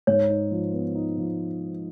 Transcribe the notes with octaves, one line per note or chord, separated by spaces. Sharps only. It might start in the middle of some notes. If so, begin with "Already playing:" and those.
G#2 C#5
D#4
F3
B3
D#4
F3